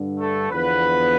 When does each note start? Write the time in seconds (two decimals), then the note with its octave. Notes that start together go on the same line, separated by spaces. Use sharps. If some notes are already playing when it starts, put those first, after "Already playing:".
Already playing: G2 D3
0.19 A3 A4
0.51 E2 D3 F3 B3 B4